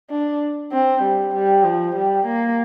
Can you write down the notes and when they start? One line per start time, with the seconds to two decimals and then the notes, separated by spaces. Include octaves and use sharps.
0.10 D4
0.72 C4
1.02 G3
1.34 G3
1.64 F3
1.96 G3
2.26 A#3